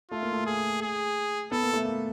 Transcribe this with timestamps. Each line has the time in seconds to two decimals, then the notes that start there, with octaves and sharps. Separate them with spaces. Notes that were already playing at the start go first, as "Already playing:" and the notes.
0.11 A3 F4
0.23 A#3
0.32 A3
0.46 G#4
0.82 G#4
1.52 B3 A4
1.63 A#3
1.74 A3
1.85 A#3